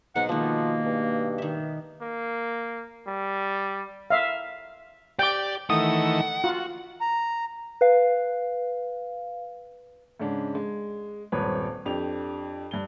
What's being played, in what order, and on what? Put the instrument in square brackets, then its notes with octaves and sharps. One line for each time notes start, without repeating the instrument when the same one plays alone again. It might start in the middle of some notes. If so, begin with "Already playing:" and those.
[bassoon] G#2 [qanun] B2 F#3 [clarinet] F#5
[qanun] D#3 G#3 [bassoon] F3 [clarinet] A#3
[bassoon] G2
[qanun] D#3 E5
[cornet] A#3
G3
[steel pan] E5 F5
[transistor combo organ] G4 [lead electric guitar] D5 [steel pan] G5 D6
[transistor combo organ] D#3 E3 A3 [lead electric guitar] F#5 [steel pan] D#6
[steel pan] F4 [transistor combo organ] F#4
[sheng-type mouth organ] A#5
[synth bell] B4 F5
[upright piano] G#2 C#3 G#3 C#4 D4
G#3
D#1 G#1 G2 B4 C#5
F2 D4 G4 F7
G2 G7